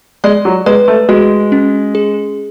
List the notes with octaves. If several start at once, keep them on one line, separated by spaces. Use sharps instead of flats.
G#3 D5
F#3
G#3 B4
A3
G#3 F#4
C#4
G#4